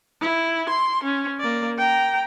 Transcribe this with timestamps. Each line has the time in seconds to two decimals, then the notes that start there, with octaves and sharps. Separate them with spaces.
0.21 E4
0.69 C6
1.03 C#4
1.40 A#3 D5
1.78 G5 A#5